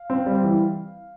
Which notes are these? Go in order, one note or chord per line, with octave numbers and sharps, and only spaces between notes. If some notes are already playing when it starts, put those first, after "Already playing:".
Already playing: F5
C4
G3
E3